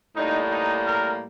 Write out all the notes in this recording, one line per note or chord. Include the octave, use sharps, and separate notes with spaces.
A2 G3 A#3 D#4
D#4
A#4